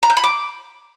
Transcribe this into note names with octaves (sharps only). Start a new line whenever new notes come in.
A#5
G6
B5
D6